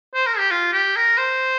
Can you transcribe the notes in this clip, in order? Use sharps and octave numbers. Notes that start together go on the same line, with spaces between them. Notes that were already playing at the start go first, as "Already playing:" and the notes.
C5
A#4
G4
F4
G4
A#4
C5